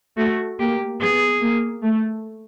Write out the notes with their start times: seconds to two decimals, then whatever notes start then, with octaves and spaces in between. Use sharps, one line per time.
0.17 A3 F#4
0.59 A#3 G4
1.01 B3 G#4
1.42 A#3
1.83 A3